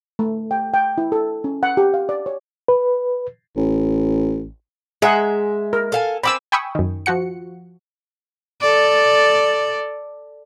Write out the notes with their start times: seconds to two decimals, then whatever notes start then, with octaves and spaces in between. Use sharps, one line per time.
0.19 A3
0.51 G5
0.74 G5
0.98 E4
1.12 A4
1.44 C#4
1.63 F#5
1.77 G4
1.94 F5
2.09 D5
2.26 C#5
2.68 B4
3.56 A1
5.02 G#3 G#4 E5 F#5 A#5
5.73 A#4
5.92 A4 F5 G#5
6.24 C4 G5 G#5 B5 D6 E6
6.52 G5 G#5 B5 C#6 D#6 E6
6.75 F#2 D#3
7.06 F3 F#4 F#5 C#7
8.61 A4 D5